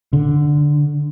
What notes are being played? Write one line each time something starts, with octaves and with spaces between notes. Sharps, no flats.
D3